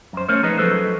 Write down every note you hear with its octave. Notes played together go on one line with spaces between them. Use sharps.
F#2 C5
A3 C#4 A#4 C5 C#5
F3 D#4 G#4 B4 D#5
F3 F#3 G#3 A4 B4 C5